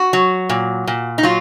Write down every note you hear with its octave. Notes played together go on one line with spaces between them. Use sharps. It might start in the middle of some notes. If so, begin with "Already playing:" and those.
Already playing: F#4
F#3
A#2
A#2
D#4
F#3 F4